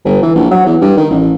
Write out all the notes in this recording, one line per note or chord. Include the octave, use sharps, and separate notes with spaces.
G1
E3
A#1
F#3
E2
G2
D#3
A1